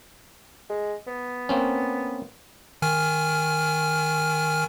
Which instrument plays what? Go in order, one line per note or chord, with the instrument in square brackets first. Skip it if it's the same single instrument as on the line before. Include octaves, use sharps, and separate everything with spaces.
[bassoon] G#3
B3
[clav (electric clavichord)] A#3 C4 C#4
[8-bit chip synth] D#3 G#5 F6